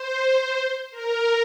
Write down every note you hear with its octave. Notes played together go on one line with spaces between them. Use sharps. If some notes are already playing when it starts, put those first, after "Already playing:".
Already playing: C5
A#4